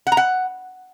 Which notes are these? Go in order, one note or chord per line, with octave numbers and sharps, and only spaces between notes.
F#5
A#5
F#5